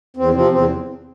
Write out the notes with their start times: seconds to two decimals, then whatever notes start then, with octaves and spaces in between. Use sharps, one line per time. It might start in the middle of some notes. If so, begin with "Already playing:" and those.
0.17 E2 C4
0.34 C3 F3 C4
0.51 E2 C4